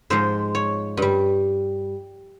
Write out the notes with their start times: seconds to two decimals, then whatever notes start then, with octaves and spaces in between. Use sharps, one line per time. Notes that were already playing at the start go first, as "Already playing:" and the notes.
0.10 G#2 F3 G#3 C5
0.55 C#5
0.97 G2 G3